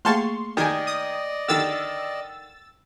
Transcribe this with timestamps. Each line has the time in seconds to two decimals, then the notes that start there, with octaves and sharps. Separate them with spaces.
0.05 A3 A#3 G#4 F5 A5 C6 C#6
0.57 D#3 D5 D#5 G5 G#5 D#6
0.87 D#6
1.48 D3 D#3 E6 A6